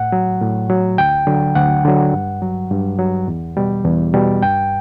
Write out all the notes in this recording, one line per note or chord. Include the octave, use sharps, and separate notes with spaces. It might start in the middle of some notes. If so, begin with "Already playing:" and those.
Already playing: A2 F#5
F#3
A2
F#3
D2 G5
D3 F#3
D2 F#5
D3 F#3
G2
F#3
G2
F#3
E2
B2 G3
E2
B2 G3
G2 G5